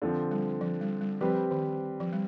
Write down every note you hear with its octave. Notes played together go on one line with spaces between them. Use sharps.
D3 F3 C4
G3
F3
G3
G3
F3 G3 C4 G4 B4
D#3
F3
G3